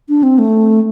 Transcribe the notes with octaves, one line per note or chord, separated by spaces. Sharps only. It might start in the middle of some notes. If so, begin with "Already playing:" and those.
D4
C4
A3